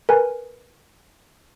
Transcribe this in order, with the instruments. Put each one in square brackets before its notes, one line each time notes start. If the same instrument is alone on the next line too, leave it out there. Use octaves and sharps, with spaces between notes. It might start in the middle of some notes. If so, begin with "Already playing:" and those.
[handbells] A#4 B4 G#5